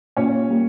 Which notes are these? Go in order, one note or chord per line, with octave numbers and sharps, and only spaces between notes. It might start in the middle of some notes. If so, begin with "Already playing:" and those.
A#2 C#4 C#5
G3 A#3